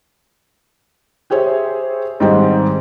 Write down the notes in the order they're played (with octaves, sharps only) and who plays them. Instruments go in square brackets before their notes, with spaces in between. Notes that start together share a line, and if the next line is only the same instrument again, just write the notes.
[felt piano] G4 G#4 C5 C#5 E5
G#2 D#3 G3 G#3 C4